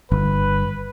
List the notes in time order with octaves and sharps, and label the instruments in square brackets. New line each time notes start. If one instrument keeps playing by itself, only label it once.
[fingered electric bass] G1 [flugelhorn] B4